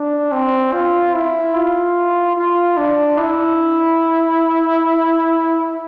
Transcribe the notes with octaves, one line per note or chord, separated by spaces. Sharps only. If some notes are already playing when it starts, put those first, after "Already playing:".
Already playing: D4
C4
F4
E4
F4
F4
D4
E4